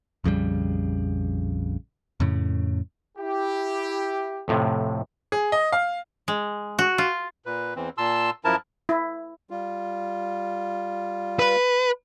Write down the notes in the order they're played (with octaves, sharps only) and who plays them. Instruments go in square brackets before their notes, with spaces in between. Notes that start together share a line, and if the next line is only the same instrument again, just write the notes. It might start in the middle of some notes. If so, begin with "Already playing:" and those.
[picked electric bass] A#1 F2 C#3 G3
F2 A2 C#3
[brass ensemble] E4 G4
[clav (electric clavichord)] F2 A2 C3
[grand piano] G#4
D#5
F5
[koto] G#3
F#4
F4
[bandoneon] A#2 B4
E2 E3 C4
A#2 A5 C6 E6
F#2 F3 E4 A#4 A5
[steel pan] E4
[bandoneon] G3 F4
[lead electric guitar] B4